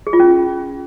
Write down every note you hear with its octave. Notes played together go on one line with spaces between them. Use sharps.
G#4
F4
C#4